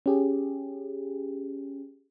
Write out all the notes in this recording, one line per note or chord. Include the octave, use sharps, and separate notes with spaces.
C#4 G4 G#4